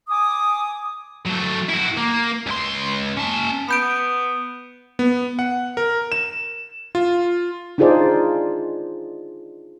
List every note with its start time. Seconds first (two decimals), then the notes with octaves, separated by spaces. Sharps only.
0.09 G#5 D6 D#6
1.26 F#3 A3
1.69 E4 F#4
1.97 A#3
2.47 C#2 C6
3.17 C#4 A5
3.69 B3 B5 G6 D7
4.99 B3
5.39 F#5
5.77 A#4
6.12 E7
6.95 F4
7.78 D4 D#4 F4 G#4 C5 D5